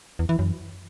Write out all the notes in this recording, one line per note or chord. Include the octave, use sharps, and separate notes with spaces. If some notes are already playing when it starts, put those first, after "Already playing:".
E2
E3
F#2